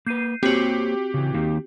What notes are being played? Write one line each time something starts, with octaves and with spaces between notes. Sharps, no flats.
A#3 B4 G6 C7 D#7
A#3 C4 F#4 G4 C5 C#5
C#3 E3
D#3 A#3 D#4